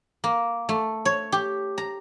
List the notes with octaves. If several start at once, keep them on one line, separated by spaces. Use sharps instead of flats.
A#3
A3
C#5
G4
A#5